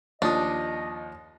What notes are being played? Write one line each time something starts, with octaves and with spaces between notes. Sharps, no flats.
D#2 F3 D4 D#5 D#6